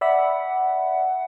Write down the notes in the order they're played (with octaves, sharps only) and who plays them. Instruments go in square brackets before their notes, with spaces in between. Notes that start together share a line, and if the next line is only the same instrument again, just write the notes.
[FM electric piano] D5 E5 B5 [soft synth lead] F#5